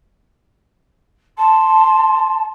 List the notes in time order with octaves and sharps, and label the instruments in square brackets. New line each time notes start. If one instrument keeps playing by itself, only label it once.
[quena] A5 [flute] C6